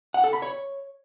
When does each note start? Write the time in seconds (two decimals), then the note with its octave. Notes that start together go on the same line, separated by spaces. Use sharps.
0.14 F#5
0.24 A4
0.33 B5
0.42 C#5